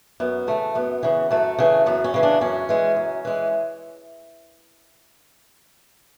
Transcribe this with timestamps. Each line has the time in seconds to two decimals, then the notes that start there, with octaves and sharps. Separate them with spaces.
0.20 F#2 B3
0.47 C#3 E3 A3
0.75 F#2 B3
1.03 C#3 E3
1.31 F#2 A3
1.58 C#3 E3
1.86 F#2 B3
2.04 C#4
2.14 C#3 E3
2.23 D4
2.41 F#2 C#4
2.69 E3 G#3
2.97 F#2
3.25 E3 G#3